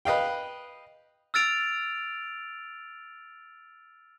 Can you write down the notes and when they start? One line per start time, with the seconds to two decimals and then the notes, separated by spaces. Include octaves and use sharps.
0.05 B4 D#5 F5 G5
1.34 E6 F6 A6 D7 F7